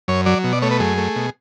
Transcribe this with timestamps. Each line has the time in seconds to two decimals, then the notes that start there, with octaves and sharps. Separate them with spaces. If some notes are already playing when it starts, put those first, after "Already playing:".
0.08 F#2 C#5
0.26 F#3 D5
0.44 B2
0.53 D5
0.62 A3 C#5
0.71 B4
0.80 F#2 G#4
0.98 A3
1.16 B2